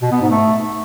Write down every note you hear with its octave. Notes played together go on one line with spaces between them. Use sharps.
B2
B3
G#2
A3